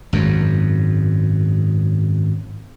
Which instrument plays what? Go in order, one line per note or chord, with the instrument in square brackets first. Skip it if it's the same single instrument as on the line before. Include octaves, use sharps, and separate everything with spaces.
[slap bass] G#1 F#2